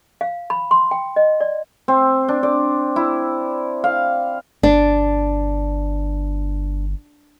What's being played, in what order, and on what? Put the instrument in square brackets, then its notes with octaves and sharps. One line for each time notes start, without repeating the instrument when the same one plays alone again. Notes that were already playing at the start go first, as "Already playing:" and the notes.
[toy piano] F5
B5
C6
G5
D#5
D5
[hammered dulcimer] C4
D4
D5
E4
F5
[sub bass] G1 [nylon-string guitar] D4